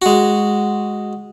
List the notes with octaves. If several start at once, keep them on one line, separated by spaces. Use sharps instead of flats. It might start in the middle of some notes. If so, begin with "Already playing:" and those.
G#3 F#4